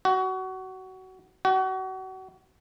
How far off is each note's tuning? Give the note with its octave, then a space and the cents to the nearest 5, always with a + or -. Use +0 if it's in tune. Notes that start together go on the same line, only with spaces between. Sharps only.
F#4 +20
F#4 +30